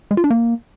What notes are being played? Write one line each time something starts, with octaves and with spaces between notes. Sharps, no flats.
G#3
F4
D4
A#3